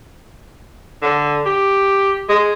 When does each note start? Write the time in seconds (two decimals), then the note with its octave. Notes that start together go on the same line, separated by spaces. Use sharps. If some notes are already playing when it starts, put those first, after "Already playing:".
1.02 D3
1.46 G4
2.29 G#3